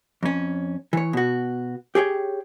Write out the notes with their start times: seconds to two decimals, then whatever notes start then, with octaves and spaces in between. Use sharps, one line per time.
0.23 F2 C#4
0.93 E3 C#5
1.13 B2 F#4
1.95 G4 G#4 C#5 G5